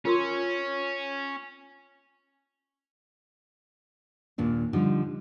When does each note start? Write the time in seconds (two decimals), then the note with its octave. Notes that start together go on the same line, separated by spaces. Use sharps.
0.05 C#4 F4 A#4 C6
4.38 D#2 A#2 D4
4.73 D3 F3 G3 D#4